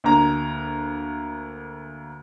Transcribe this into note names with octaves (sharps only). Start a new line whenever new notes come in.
D2 A#3 A#5